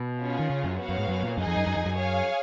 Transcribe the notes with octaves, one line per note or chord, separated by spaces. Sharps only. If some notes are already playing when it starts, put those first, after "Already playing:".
Already playing: B2
C#4 F4 G#4 C#5
D#3
C#3
F#2
B3 F#4 C#5 F5
F#2
G#2
F#2
A#2
F#2 D#4 G#4 D#5 G#5
F2
F#2
F#2
F2
F#2
G#4 C#5 F5 G#5